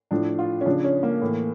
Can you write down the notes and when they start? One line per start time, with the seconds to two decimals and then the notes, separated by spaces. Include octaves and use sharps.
0.11 A2 F3 D4
0.39 F4
0.61 C#4
0.66 C#3 F3 D4
0.84 C#4
1.03 A#3
1.22 A2 E3